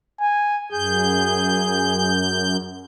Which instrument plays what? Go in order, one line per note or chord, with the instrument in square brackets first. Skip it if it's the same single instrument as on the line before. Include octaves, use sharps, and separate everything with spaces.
[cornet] G#5
[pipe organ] F#2 G6 [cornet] G#4